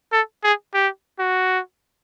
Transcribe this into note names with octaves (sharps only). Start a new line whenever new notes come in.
A4
G#4
G4
F#4